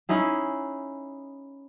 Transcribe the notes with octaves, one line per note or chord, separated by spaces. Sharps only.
C#4 D#4 E4 G#4